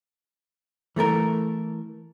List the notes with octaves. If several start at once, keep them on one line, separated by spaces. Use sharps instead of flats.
E3 A3 A4 A#4